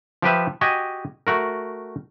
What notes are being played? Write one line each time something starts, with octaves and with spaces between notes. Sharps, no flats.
F3 G4 B4 E5
F#4 G4 D#5 G#5
A3 F#4 A#4